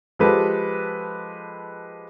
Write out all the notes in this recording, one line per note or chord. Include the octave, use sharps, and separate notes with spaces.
F3 G#3 G4 A4 B4